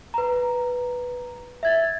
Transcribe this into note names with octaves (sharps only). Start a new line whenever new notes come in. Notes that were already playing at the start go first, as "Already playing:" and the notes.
B4 A#5
E5 G#6 A6